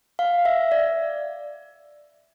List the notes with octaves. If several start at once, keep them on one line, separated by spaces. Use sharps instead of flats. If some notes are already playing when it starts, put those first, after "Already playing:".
F5
E5
D5